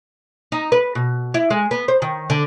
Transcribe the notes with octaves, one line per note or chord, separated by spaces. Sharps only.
D#4
B4
B2
E4
G#3
B3
C5
D#3
D3